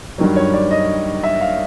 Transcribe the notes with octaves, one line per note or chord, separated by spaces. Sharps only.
G2 D#3 F#3
C#5
D5
D#5
E5
F5